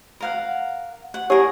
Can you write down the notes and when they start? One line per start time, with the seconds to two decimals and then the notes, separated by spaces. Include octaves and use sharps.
0.20 A#4 F5 F#5
1.14 F#5
1.30 E4 G4 G#4 A#4 C#5